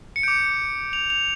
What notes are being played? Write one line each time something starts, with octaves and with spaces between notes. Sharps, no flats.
C#7
D6 G6 D7
F7
F7